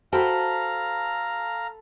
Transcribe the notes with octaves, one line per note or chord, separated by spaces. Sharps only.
F#4 A4 C5 F5 G5 A#5 B5 D#6